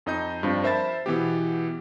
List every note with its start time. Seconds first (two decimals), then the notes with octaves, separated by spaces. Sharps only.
0.06 F2 D#4 D#5 G6
0.43 G2 F3 C4 D4
0.63 A#4 C5 E5 A5 B5 A6
1.06 B2 E3 B3 G4